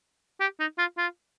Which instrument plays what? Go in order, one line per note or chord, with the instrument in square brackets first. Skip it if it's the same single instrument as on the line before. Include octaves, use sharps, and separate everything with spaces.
[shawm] G4
D#4
F4
F4